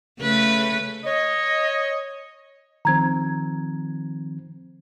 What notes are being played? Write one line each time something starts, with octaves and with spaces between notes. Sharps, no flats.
C#3 A3 B4
C#5 D#5
D#3 F3 C4 A#5 G#6